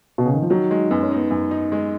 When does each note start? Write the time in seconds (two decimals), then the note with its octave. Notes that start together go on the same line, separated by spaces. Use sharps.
0.18 B2
0.25 C#3
0.34 D#3
0.42 F3
0.50 D#3 F#3
0.71 G#3
0.90 F#2 B3
1.03 C#4
1.11 B3 D#4
1.31 F#2
1.51 D#4
1.72 G#3